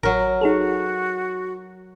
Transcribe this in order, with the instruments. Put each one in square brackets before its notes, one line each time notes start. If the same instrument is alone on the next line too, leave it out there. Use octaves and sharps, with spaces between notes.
[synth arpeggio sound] A1 [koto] F#3 A#4
[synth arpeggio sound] D#4 G#4 A4 [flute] F#4